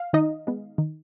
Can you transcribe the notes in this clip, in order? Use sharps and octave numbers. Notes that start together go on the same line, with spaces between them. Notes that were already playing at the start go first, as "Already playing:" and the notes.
Already playing: F5
D#3 D#4 D#5
G#3 B3
D#3